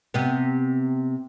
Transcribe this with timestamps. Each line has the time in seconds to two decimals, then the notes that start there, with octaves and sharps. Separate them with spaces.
0.14 C3 B3